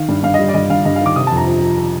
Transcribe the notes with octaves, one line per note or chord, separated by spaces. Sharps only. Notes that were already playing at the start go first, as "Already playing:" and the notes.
Already playing: D#3 F5
G2
G2 F5
G3 D#5
D5
G2 D#5
G2 F5
G2 D#5
F5
D#3 D6
C3 D#6
F2 A5
A#5
F3
F3
F3